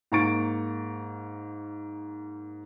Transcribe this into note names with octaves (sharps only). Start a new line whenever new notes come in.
G#2 A#3 A#5 C#6 A6 D7